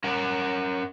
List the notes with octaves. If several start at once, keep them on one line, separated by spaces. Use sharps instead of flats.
C#4 A#4 F#5